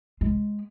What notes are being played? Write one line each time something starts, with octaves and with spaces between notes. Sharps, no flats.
G#3